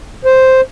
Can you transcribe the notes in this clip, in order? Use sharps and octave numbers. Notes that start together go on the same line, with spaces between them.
C5